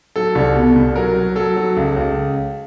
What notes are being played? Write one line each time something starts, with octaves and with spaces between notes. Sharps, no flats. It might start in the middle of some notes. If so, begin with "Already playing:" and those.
F#3 A4
C2
B2
C2
F#3 A#4
F#3
F#3 A4
F#3
C#2
C#2